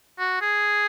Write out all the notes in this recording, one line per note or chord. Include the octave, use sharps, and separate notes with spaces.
F#4
G#4